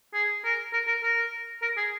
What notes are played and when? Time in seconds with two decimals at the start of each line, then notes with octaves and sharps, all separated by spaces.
0.14 G#4
0.45 A#4
0.73 A#4
0.88 A#4
1.03 A#4
1.62 A#4
1.77 G#4